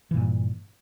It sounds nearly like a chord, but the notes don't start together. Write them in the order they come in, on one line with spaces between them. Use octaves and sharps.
E3 A#2 G2